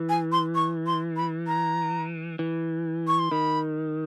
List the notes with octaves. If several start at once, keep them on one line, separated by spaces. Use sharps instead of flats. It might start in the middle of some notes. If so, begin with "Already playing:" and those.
Already playing: E3
G#5
C6
C#6
C6
B5
A#5
E3
C#6
C6
D#3 B5